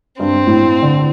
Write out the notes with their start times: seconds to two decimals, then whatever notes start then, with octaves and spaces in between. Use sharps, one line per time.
0.20 G2 C4
0.33 G2
0.47 A2
0.61 A2
0.82 D3